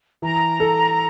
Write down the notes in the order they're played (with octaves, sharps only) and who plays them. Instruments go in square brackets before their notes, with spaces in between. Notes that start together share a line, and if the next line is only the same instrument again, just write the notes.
[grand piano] E3 [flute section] A#5
[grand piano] A4